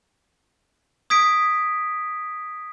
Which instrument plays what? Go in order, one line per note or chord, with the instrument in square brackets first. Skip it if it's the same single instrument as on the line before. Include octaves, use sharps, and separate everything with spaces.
[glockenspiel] D#6 G#6 B6 D7